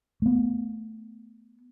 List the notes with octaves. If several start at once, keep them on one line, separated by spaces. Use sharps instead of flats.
A3 B3